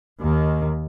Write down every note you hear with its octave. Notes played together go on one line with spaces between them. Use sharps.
D#2 D#3